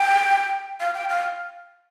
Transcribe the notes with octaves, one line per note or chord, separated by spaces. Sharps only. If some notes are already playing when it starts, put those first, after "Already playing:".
Already playing: G5
F5
G5
F5